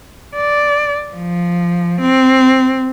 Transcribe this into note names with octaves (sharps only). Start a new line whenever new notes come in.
D5
F3
C4